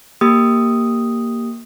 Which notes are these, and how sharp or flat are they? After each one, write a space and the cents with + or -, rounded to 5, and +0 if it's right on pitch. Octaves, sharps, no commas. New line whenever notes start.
A#3 +0 G4 +0 D#6 +0